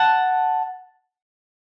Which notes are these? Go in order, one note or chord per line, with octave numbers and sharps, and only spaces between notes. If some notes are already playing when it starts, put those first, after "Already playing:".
Already playing: F#5 A5